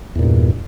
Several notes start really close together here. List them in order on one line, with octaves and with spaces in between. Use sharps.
E2 A#2 G2